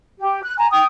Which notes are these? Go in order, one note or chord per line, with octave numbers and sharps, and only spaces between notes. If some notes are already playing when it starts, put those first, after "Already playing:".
G4
F#6
G#5 A#5
G5 D#6